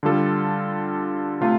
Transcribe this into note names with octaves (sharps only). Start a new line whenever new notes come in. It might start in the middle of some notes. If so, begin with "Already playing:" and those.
D3 G3 F4 A4
C3 A3 F4